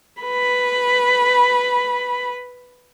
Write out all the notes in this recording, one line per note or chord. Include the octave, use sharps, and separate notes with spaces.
B4 B5